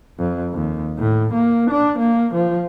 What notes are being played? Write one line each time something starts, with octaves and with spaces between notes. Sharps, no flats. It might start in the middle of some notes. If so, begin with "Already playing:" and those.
F2
D#2
A2
A#3
D4
A#3
F3